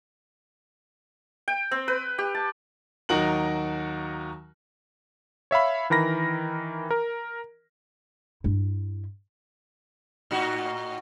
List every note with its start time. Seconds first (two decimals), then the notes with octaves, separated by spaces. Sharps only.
1.48 G5
1.71 C4
1.88 B4
2.18 G4
2.35 A5
3.09 D#2 F#3 D#4 F#4 A#4 F#7
5.51 C#5 E5 F5 B5
5.90 D#3 E3 A#4 B5 A#6
6.91 A#4
8.44 G2 E4
10.31 A2 D#4 F#4